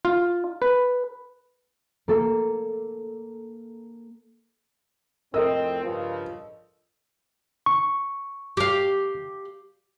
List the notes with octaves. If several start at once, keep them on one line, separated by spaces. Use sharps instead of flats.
F4
B4
A#3 A4
F2 A2 C4 A4 A#4 D#5 E6
G2 C#3 F3
C#6
G4 F5